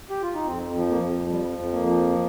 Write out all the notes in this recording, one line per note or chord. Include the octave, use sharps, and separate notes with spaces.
G4
F4
D#4
F2 C4
F3
A#3
F2
F3 G3
F2
A#3
F3